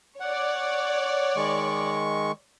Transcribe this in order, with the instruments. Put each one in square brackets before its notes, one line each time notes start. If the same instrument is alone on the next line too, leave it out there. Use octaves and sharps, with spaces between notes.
[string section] C#5 D5 [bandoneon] F#5
[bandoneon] D#3 G#3 C#6